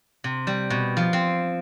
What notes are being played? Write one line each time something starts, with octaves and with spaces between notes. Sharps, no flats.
C3
G3
B2
F3
C4